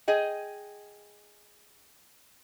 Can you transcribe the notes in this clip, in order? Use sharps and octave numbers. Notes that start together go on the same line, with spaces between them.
G#4 D#5 G5